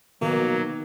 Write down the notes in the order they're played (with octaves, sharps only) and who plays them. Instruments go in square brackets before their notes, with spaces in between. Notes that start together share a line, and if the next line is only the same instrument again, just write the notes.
[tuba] B2 [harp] D#3 [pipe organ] F#3 [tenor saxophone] A#3